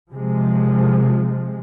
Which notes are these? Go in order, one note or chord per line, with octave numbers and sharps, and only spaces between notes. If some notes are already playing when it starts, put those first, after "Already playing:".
C3 F3 G#3